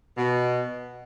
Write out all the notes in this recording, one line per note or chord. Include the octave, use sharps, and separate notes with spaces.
B2